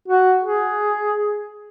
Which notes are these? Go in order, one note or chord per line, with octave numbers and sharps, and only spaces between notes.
F#4
G#4